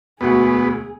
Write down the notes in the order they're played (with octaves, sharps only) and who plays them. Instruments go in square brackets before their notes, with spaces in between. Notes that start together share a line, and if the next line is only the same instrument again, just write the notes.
[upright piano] E1 D2 F#5 [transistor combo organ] B3 [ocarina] F#4 [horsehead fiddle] G#4